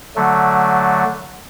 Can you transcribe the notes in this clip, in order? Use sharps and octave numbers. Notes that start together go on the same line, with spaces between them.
D3 F#3 A3